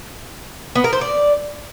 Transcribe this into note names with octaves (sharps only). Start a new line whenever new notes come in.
B3
A#4
C5
D5